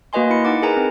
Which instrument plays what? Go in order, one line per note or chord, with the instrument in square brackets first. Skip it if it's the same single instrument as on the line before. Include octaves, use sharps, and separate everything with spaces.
[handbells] A#3 F#4 B4 D#5 G#5 C6
E4 C#7
D#4 F#5 D6
G#4 A#4 B4 G#5 A#5
C4